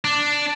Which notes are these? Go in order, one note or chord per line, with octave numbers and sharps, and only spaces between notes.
D4